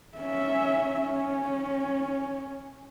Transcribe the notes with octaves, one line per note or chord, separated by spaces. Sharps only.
C#4 E5
C#4